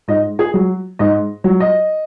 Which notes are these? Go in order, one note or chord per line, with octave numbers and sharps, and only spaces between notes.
G#2 D#5
G#4 G#5
F#3
G#2 D#5
F#3
D#5